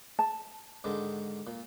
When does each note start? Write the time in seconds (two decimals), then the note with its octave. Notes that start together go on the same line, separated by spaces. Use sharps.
0.19 A5
0.84 G#2 D3 D#3
1.47 A#2